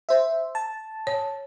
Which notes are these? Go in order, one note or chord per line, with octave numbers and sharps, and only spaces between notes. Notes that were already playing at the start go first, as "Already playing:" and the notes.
C5 E5
A5
C#5